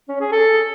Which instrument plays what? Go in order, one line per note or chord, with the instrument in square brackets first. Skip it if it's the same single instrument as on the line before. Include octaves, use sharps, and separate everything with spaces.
[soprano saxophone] C#4
G#4
A4